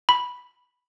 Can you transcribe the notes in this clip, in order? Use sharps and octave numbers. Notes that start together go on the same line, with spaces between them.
B5